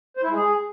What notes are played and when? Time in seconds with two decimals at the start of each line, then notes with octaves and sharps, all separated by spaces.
0.17 C5
0.23 E4
0.29 G#3
0.35 G#4